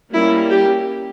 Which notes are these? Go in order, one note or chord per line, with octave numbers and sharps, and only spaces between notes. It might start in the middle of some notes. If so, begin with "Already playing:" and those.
G3 A#3 C#4 E4
G4